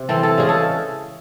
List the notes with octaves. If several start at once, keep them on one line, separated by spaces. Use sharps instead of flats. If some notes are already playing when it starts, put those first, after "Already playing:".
Already playing: C3
E3 C4 A4
A4
C#3 G#3 C#4 G#4
A4